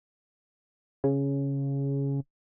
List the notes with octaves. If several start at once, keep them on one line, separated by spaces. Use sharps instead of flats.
C#3